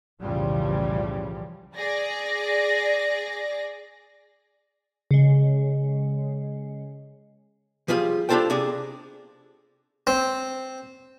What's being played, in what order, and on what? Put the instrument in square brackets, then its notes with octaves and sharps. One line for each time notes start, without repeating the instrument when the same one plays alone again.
[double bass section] B1 E2 A2 C#3 F3 G3
[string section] G#4 D5 A#6
[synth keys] C#3 G#3
[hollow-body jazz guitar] F3 G3 F4 G#4
G3 D4 F4 A4 C5 G5
C3 D4 G#4
[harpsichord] C4